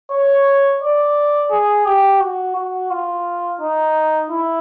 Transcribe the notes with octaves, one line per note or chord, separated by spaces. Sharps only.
C#5
D5
G#4
G4
F#4
F#4
F4
D#4
E4